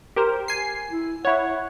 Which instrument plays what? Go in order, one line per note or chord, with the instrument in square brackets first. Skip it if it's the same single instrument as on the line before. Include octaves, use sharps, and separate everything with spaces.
[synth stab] G4 A#4 C5
G#5 C7
[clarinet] E4
[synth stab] E4 C#5 [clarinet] F#5